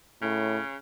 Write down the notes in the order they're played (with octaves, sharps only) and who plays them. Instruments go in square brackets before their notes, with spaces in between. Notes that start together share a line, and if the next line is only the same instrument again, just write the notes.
[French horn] A2 [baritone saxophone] C#3